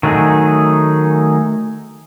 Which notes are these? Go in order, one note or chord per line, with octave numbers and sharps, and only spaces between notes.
D#3 F#3 A3 D#4 G#4